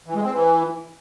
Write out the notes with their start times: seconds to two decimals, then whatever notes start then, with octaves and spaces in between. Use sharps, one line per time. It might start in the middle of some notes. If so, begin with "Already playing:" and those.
0.06 E3
0.15 G#3
0.23 C4
0.32 E3